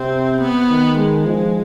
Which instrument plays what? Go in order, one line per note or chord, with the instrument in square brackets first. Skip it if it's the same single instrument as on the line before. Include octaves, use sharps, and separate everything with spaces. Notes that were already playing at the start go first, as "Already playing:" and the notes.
Already playing: [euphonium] C3 [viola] C4
[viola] B3
[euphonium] D#3
[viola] G#3
[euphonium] F3